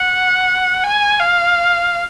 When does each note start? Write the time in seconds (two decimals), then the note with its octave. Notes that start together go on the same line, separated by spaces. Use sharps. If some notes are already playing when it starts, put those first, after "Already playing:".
Already playing: F#5
0.84 G#5
1.20 F5